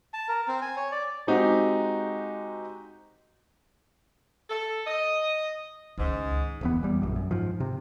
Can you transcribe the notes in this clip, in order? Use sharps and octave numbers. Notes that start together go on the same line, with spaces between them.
A5
A#4
C4
G#5
C#5
D5
G#3 C4 D#4 F#4 G4
A4
D#5
C#2 G#2 D#3
D1 E2 B3
E2 G3
A#1 F#2
F#2
G#2 F3
C3